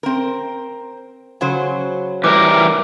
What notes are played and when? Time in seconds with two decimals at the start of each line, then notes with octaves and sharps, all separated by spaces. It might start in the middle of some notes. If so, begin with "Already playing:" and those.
0.03 C4 A#4
1.41 C#3 F#3 C5
2.24 E3 G3 A#4 D6